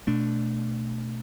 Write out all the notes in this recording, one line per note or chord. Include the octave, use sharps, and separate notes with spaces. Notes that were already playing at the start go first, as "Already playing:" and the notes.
B2 A3 D4